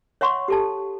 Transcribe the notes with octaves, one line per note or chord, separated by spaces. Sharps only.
C#5 E5 F#5 C6 C#6
G4 A4 A5